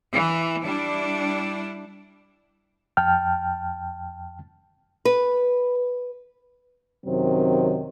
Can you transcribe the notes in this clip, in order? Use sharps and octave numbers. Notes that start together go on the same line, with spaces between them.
E3
G3 D4 E4
F2 G5 A5 F6
B4
F#2 C3 D#3 F#3 C4